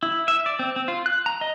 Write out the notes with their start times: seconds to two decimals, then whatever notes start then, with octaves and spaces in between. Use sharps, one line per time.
0.03 E4
0.28 E5
0.46 D5
0.59 C4
0.76 C4
0.88 F4
1.06 F#6
1.26 A#5
1.41 D#5